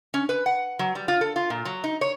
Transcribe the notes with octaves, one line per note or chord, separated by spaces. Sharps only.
C#4
B4
F#5
F#3
G3
F4
A4
F4
A#2
F#3
D#4
C#5